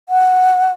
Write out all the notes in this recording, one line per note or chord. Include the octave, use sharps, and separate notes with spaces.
F#5